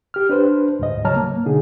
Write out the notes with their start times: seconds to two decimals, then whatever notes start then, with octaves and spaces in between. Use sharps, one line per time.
0.14 G4 F6
0.29 D4 B4 C5
0.79 D2 G#2 D#5
1.04 C#3 F#3 C#5 A5 A#5 F6
1.16 A#3
1.45 B2 D3 D#4 G#4